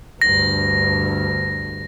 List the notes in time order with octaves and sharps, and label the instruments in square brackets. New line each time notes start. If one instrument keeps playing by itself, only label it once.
[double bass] D2 G2 [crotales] A#6